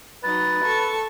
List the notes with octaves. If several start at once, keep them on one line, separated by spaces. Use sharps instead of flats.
F#3 D#4 B4 A6
A4 A5 C#6